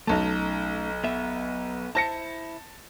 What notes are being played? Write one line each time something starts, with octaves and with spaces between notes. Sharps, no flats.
B1 A3 C#4 D#4 A5
B3 E5
E4 C5 A5 A#6 C#7